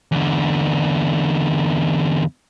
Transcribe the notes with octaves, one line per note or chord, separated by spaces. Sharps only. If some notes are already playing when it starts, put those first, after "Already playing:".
E2 D3